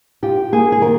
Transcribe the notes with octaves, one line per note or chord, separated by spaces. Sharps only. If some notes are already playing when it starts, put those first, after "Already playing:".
F4 G4
A#3 G#4
G#4
D#3 A#4